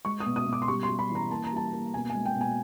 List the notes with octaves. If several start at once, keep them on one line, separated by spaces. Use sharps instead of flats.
G#3 C#6
D#6
B2
D#6
B2
D6
C6
G3 C#6
C6
G3
B5
E3
A#5
A#3 A5
A#5
G3 A5
A#3
B2 G#5
G#5
G#3
G5
B2
G#5